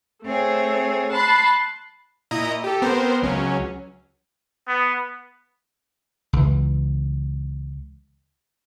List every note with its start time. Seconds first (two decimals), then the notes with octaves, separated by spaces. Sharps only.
0.24 A3 C4 G#4 C#5
1.12 A5 B5 C6 F#6
2.31 A#2 E4 D#5 A#5 D#6
2.64 G4 A4
2.82 B3 C4 A#4 C5
3.22 C#2 F#3 C#4
4.68 B3
6.33 C#2 E3